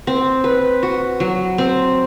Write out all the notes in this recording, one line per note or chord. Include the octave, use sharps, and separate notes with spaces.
C4
B4
F#4
F#3
C4